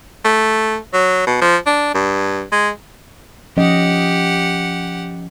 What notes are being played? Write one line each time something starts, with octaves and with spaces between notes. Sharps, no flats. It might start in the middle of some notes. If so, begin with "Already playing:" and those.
A3
F#3
B2
F3
D4
G2
G#3
F3 C#4 G4 D#5 F#5